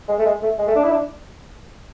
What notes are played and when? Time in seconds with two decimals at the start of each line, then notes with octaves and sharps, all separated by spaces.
0.09 G#3
0.19 A3
0.25 G#3
0.43 A3
0.59 G#3
0.68 A3
0.76 D4
0.84 E4
0.92 D4